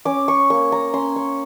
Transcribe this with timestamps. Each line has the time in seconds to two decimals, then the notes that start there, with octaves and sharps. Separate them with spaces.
0.05 C#4 D6
0.28 C#6
0.50 A#3 C#6
0.72 A#5
0.93 C#4 C6
1.16 C#6